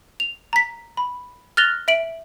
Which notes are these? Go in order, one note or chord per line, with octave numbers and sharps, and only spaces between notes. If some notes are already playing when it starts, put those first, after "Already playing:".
F7
A#5 B6
B5
F6 F#6 A6 A#6 F7 G7
E5 D7 F#7